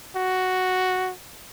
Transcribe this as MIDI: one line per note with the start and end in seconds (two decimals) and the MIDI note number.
0.16 1.12 66